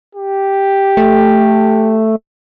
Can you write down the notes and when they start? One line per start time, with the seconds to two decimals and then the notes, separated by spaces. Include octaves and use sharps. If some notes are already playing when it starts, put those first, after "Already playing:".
0.15 G4
0.97 A3